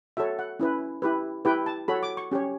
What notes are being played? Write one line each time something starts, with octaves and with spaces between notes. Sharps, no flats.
F#4 A4 C#5 E5
F#5
C#4 E4 B4
E4 G4 B4
E4 G4 B4 G5
A5
F#4 A4 C#5 B5
D6
C#6
C#4 G4 C#5